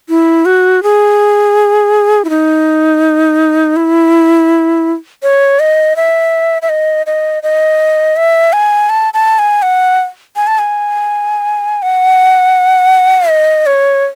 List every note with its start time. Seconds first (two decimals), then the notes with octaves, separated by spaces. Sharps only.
0.09 E4
0.45 F#4
0.83 G#4
2.25 E4
2.30 D#4
3.76 E4
5.23 C#5
5.60 D#5
5.96 E5
6.62 E5
6.69 D#5
7.06 D#5
7.43 D#5
8.16 E5
8.53 G#5
8.89 A5
9.14 A5
9.39 G#5
9.62 F#5
10.36 G#5
10.47 A5
10.59 G#5
11.82 F#5
13.29 D#5
13.66 C#5